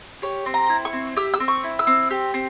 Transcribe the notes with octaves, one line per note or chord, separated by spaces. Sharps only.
G4 C#5
C4
A#5
E4
C#6
C4
G4 E6
E6
C4
C#6
E4
E6
C4
G4
C4